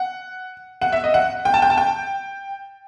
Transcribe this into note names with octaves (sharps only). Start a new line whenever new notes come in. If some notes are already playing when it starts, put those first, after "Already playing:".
Already playing: F#5
F#5
E5
D#5
F#5
G5
A5
G5
A5
G5